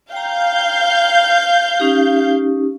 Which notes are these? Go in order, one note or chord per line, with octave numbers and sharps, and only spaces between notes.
F5 G5 A#5 G6
C#4 D#4 G4